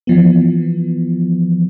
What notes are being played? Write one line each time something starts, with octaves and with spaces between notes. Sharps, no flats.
E3 F3 B3